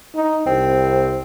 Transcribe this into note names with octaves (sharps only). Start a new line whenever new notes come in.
D#4
C2 C4